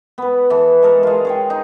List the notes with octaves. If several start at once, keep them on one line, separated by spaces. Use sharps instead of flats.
B3 B4
E3 A4
G#3 A4 A#4 E5
G#3 F4
G#4 C#5 G5
D#4